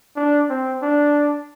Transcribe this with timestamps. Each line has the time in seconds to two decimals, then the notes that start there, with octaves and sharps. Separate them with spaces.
0.16 D4
0.49 C4
0.82 D4